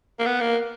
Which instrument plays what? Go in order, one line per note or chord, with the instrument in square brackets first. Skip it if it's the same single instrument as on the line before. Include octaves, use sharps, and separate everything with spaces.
[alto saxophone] A#3
B3
A#3